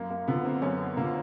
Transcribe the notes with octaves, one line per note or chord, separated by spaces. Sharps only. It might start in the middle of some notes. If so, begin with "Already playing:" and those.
Already playing: F#2 A#3
A#3
D3 F3 B3
A#3 C4
F#2 B3 C#4
B3
D3 F3 A#3